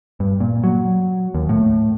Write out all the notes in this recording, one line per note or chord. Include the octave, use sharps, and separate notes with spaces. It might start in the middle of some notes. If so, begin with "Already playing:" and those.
G2
A#2
F#3
D#2
A2